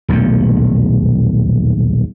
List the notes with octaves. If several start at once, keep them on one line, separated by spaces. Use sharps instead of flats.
D#1 B1 E2 A3